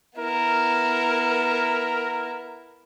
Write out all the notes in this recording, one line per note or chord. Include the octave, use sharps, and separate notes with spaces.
B3 E4 A#4